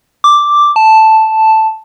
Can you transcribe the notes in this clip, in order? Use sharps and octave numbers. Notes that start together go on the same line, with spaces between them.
D6
A5